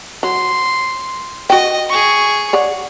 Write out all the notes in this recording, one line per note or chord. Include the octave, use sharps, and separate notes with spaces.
F#3 C6
F#4 D#5 G5
G#4 C#6
C#5 D5 F#5